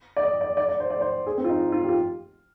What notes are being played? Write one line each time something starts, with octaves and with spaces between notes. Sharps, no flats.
D5
D#5
D5
D5
D5
C5
D5
C5
G#4
C4
F4
D#4
F4
G4
F4